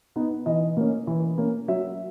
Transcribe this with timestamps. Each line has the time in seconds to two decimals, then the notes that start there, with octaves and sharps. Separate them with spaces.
0.16 B3 D#4
0.46 E3 D#5
0.77 A#3 C#4
1.07 E3
1.38 A#3 C#4
1.68 F#3 E5